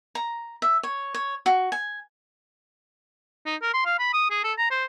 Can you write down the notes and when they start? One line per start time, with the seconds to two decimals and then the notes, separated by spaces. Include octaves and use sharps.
0.15 A#5
0.62 E5
0.83 C#5
1.14 C#5
1.46 F#4
1.72 G#5
3.46 D#4
3.62 A#4
3.74 C6
3.86 F5
3.99 B5
4.13 D#6
4.31 G#4
4.44 A4
4.58 A#5
4.71 C5